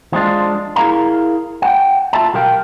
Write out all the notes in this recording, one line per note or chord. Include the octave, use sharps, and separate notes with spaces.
F3 G#3 D4 F4
E4 G#4 A#4 F5 A#5
F#5 G5
F4 A4 E5 A5
B1 G4 A#4 F5 G5